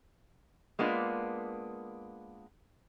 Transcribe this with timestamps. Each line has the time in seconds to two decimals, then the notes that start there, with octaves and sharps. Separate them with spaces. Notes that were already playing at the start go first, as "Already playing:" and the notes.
0.79 G#3 A#3 B3 D4 F4